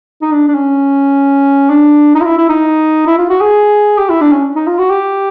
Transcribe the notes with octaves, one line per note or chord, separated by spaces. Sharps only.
D#4
D4
D4
C#4
D4
D#4
F4
E4
E4
D#4
E4
F4
F#4
G#4
G4
E4
D4
C#4
D#4
F4
F#4
G4